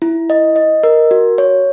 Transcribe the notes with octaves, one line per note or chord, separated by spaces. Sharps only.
E4
D#5
D#5
A#4
F#4
C#5